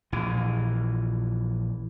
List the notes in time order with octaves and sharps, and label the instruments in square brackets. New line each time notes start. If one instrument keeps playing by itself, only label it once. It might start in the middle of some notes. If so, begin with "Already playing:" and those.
[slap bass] A#1 E3